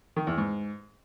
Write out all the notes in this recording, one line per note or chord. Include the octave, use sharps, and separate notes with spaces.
D#3
E2
G#2